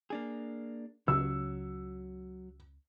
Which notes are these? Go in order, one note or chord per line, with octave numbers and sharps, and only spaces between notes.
A#3 D4 G#4
C#2 C#3 F#3 E6